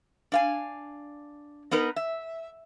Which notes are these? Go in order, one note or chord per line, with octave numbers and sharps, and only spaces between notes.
D4 F5 G#5
B3 D#4 A#4 B4
E5